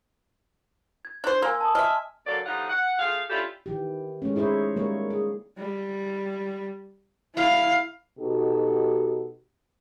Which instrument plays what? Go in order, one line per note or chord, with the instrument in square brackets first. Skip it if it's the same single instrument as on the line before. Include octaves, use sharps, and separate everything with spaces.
[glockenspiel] G#6
[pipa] D4 C5
[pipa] A#3 [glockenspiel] G#5 C6 E6
[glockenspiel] A5 D#6
[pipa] D#5 E5 [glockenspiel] F6
[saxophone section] D2 F#3 A#3 A4 D5
A2 F3 G3 D#4 F4 F#5
F#5
A3 F4 G#4 F5
C#4 D4 E4 F4 G4 A4
[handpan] D#3 E3 G4
G#3 A3 C#4
D#4 E4 G#4 C5 C#5
G3 G#3 A#3 A#4 C#5
G#4
[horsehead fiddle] G3
E4 F5
[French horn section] B2 D#4 F#4 G4 A4